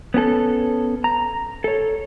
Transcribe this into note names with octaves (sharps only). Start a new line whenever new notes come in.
B3 C#4 G4 A4
A#5
A4 C#5